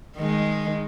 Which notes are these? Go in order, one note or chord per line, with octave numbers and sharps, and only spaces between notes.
D#3 G#3